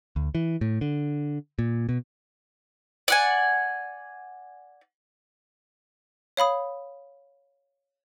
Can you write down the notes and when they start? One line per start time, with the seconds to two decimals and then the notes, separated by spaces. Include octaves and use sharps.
0.16 D2
0.35 E3
0.61 A2
0.81 D3
1.59 A#2
1.89 B2
3.08 D5 F#5 G#5
6.37 C#5 F5 B5 D#6